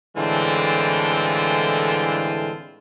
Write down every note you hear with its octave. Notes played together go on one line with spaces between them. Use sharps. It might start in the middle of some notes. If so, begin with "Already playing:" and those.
A2 D3 E3 G#3 C4 F4